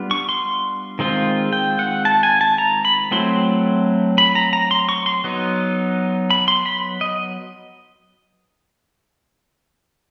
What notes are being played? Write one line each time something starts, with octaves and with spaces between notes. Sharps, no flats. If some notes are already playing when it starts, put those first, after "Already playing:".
Already playing: G3 B3 D4 F4
C#6
C6
D#3 G#3 C4 F4
G5
F#5
A5
G#5
A5
A#5
B5
F#3 A3 C4 E4 C6
B5
A#5
A#5
C6
C#6
C6
F#3 B3 D#4
B5
C6
B5
D#5